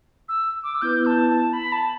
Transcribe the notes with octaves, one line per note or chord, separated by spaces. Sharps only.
E6
D6
E6
B3 E4 B4 G6
A5
A5
B5
A5